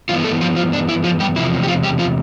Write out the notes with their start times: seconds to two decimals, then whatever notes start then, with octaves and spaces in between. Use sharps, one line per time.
0.09 G2 E3 B3 F4
0.24 A3 A4
0.41 F3 F4
0.56 F3 F4
0.73 D4
0.89 E4
1.04 F3 F4
1.20 G3 G4
1.36 E2 C3 F3 E4
1.63 G4
1.68 F3 F4
1.83 G3 G4
1.99 F3 F4